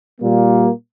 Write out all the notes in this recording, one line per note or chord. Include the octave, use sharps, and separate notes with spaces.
A#2 G3 A#3